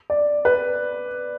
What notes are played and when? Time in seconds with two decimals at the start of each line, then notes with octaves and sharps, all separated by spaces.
0.10 D5
0.45 B4